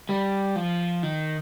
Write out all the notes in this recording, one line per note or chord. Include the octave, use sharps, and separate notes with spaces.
G3
F3
D#3